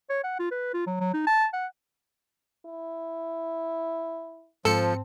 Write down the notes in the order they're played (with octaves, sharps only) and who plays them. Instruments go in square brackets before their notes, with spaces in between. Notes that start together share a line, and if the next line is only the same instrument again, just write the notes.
[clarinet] C#5
F#5
F4
B4
F4
F#3
F#3
D#4
A5
F#5
[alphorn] E4
[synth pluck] G#2 A5 [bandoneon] F3 [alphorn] C4 [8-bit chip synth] A4 C#7